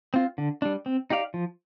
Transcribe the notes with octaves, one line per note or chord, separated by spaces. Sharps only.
C4 F4
D3
G3 D4
C4
D#4 G4 D5 F5
F3